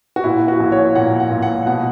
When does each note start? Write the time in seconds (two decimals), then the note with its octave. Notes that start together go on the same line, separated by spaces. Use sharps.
0.16 F#4
0.24 A#2 E4
0.48 F#4
0.60 A#1
0.72 C#5
0.95 A#2 F#5
1.20 F#5
1.31 A#2
1.42 F#5
1.66 B2 F#5